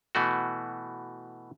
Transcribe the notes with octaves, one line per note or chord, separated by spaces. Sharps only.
B2 E3 A3 F#4